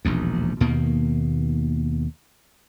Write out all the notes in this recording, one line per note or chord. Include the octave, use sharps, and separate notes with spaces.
E1 A#1 D#2
D#2 B2 D#3 A#3